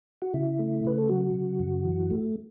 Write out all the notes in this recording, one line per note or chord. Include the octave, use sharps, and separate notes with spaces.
F#4
C#3 E4
A3
C#3 B4
A4
F#3 F#4
C#3
F#2
E3
A3